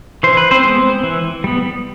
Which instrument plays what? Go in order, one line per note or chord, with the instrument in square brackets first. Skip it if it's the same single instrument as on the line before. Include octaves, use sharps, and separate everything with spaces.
[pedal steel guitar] E3 C5
B4
C4 C5
G#3 B3
E3
G3 B3